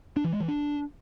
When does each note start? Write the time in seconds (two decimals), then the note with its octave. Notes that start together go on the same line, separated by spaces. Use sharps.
0.16 D4
0.24 E3
0.32 G#3
0.40 E3
0.48 D4